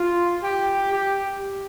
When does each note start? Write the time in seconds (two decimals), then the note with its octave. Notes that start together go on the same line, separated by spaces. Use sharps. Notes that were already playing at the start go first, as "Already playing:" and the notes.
Already playing: F4
0.43 G4
0.92 G4